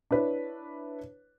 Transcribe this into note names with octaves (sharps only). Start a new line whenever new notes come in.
D4 E4 B4 C#5